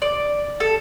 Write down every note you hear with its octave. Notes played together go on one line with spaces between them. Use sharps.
D5
A4